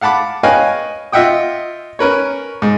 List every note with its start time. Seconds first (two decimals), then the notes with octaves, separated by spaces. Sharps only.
0.01 F5 F#5 A5 B5 D6
0.43 B4 C#5 D#5 F5 G5 G#5
1.12 F4 D#5 E5 F#5 G5 D#6
1.99 C#4 A#4 B4 C#5
2.62 G#2